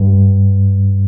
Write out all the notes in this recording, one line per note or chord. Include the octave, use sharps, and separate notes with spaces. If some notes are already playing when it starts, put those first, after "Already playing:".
Already playing: G2